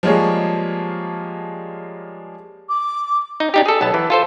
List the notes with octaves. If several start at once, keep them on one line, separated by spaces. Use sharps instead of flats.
F3 G3 G#3 A#3 G#4 C#5
D6
D#4
D4 D#4 G4
G#4 A4
B1 B3 A5
E3
F4 A4 C5